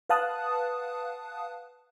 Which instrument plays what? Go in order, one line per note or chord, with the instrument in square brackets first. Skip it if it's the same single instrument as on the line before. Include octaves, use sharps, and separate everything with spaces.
[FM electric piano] B4 F5 F#5 A5 D#6 F#6